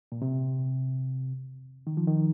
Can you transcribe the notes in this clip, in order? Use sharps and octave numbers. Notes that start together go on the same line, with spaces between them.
A#2
C3
D#3
F3
D#3